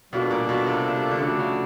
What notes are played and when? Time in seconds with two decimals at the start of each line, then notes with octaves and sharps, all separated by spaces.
0.12 B2 G3 A#3 D4 F4 A4
0.31 A#2
0.49 B2
0.67 C3
1.11 D3
1.20 C#3 F3 A3 D4 F#4 A4
1.39 C#3